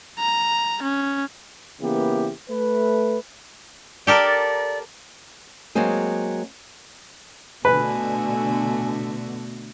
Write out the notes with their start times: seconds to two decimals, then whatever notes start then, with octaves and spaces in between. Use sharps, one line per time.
0.19 A#5
0.83 C#4
1.81 C#3 E3 A#3 B3 E4 G4
2.50 A3 B4
4.07 G4 A4 A#4 D5
5.75 F#3 G#3 A#3 C4 G#4
7.65 B2 D3 A3 B3 F#4 B4 G#5